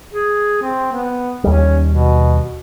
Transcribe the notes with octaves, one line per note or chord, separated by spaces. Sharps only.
G#4
C4
B3
D#2 G3 C#4
B2